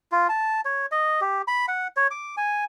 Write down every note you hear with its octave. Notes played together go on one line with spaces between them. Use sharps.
F4
A5
C#5
D#5
G4
B5
F#5
C#5
D6
G#5